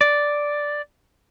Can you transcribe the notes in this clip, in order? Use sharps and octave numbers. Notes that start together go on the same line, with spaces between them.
D5